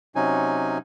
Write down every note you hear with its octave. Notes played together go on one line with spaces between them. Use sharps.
C3 F#3 C#4 D#4 G#5